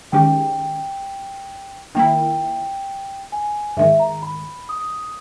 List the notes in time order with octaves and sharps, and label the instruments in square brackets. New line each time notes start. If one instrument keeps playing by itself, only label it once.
[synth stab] D#3 G#3 C#4 G4 [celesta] G5
[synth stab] D#3 A#3 E4 [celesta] G5
[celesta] G#5
[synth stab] G#2 D#3 G#3 [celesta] E5
[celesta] A#5
B5
D#6